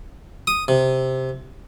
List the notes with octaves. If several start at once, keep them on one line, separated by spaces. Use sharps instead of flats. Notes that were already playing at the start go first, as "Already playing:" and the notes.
D#6
C3